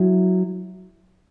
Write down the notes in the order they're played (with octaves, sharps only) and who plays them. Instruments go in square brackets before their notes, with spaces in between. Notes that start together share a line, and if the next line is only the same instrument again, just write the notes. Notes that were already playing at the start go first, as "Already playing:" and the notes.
Already playing: [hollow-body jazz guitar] F#3 E4